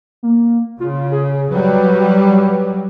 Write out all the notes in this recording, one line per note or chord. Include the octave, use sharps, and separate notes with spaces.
A#3
C#3 F4
G#4
F#3 G3 B4